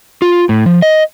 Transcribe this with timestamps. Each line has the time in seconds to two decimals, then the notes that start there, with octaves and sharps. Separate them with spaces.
0.22 F4
0.49 A2
0.66 F3
0.82 D#5